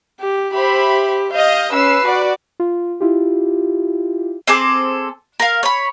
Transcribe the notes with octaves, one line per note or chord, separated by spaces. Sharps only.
G4
G4 C5 E5 B5
D#5 F5 G6
C#4 B4 E6 C7
F#4 D5
F4
E4 F4 G4
C4 G#4 A4 D6
A#4 F5
C#5 B5